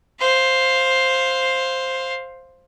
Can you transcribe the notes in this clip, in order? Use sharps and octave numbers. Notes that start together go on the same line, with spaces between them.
C5 F5